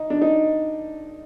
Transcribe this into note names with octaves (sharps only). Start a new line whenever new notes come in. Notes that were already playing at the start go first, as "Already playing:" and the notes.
Already playing: D#4
D4
D#4